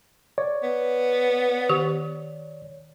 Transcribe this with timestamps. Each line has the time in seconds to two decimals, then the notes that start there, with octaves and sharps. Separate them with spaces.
0.38 C#5 D5
0.63 B3
1.69 D#3 G4